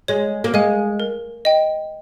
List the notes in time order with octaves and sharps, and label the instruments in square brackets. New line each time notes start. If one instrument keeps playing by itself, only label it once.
[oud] G#3 [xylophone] C#5
[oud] A#3
[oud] G#3 [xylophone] F5 G#5
[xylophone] A#4
D#5 G5